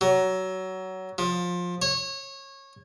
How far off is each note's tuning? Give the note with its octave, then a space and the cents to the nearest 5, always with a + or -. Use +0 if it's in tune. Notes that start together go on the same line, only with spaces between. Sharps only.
F#3 +20
F3 +20
C#5 -25